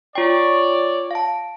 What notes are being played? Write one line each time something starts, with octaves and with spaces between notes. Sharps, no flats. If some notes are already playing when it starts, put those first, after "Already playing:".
F4 C#5 D5 G5
F5 A5